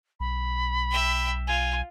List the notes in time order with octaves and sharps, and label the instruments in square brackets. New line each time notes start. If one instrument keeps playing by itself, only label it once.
[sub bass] B1 [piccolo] B5
[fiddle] E5 G5
[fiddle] F4 [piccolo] G#5